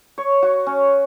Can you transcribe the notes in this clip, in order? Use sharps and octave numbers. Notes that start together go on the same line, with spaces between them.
C#5
F#4
C#4